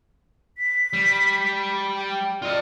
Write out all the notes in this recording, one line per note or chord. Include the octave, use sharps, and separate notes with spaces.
B6
G3
G5
F4 D5 D#5